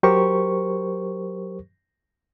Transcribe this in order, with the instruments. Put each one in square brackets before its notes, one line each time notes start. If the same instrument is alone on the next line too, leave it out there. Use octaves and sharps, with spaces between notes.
[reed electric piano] F#3 G4 A#4 C5 C#6